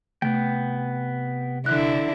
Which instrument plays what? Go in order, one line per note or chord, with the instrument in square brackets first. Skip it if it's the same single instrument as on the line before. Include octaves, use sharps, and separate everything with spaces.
[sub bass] C3 [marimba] A3 [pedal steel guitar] B3 G5
[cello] D3 E4 [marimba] F#6